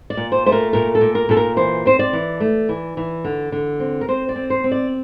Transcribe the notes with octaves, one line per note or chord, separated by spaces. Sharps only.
D5
A#2
C5
A3 C5
A#4
A#2 A#4
A4
A#2
A#4
A#2 A4
A#4
E3 C5
C4 C5
D5
E3
A3
E3
E3
D3
D3
C4
A#4
C4 C5
D5
C4
C5
C4
D5